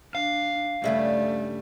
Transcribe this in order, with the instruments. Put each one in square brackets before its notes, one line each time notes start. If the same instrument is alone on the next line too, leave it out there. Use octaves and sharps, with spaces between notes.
[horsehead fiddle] D4 [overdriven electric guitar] F5
[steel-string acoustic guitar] G2 C#3 G3 [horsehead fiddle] A3 [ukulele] G#4 C#5 E5